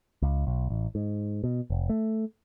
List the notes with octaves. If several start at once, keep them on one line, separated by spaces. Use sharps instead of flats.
C#2
B1
A1
G#2
B2
F1
A3